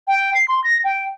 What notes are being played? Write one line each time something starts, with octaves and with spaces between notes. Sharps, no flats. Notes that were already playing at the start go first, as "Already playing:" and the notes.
G5
C7
C6
A#6
G5